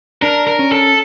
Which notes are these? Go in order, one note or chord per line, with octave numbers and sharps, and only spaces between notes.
D4 A#4
A#4
C#4
A4